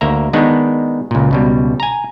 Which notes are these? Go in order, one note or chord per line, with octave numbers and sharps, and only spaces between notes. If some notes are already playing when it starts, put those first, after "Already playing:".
D2 A#3 E5 A#5
D#3 G#3 B3 D4 D#4
C#2 A#2
C#2 B2 G3
G#5 A#5